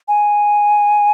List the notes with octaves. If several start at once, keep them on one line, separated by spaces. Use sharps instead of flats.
G#5